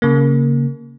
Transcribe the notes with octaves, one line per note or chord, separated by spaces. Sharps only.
C#3 A#3